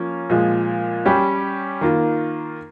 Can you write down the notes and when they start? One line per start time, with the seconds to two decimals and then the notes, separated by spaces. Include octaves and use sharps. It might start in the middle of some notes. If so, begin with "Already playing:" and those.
Already playing: F3 A#3 C#4
0.30 A#2 F3 G#3
1.06 G3 C#4 G4
1.81 D#3 A#3 F4